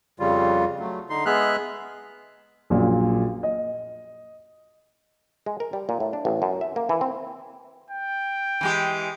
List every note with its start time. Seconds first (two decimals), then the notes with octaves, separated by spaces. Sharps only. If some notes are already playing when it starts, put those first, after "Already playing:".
0.20 F2 C#3 G3 F4
0.79 F#3 A3
1.10 D3 D#4 C6
1.25 G#3 B3 G#4 E5 F6 F#6
2.70 A#1 F#2 A#2
3.43 D#5
5.46 G#3
5.60 A#4
5.73 G3
5.89 A#2
6.00 A2
6.13 D4
6.25 A1
6.42 F#2
6.61 E5
6.76 A#3
6.89 E3
7.01 C4
7.90 G5
8.61 E3 G#3 G4